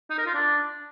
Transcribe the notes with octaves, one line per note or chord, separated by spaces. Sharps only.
D#4
A#4
F4
D4